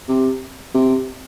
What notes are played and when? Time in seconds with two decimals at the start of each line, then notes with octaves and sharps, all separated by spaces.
0.09 C3
0.75 C3